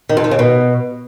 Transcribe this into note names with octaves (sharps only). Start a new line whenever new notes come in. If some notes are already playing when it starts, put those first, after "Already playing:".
D#3
F2
D#3
C#3
B2